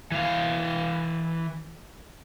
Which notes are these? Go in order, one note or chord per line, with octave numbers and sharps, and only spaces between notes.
E3 F5